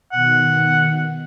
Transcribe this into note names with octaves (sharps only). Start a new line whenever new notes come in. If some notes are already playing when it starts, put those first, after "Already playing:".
B2 D#3 F#5